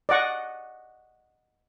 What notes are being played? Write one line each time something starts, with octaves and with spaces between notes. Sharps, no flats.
D5 D#5 F#5 C#6